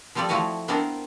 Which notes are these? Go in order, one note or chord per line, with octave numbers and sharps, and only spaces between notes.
F3 G3 C4 A4 D5
F3 A3 E4 F#4 F5 G#5
B3 C4 D4 A4 A#4 C5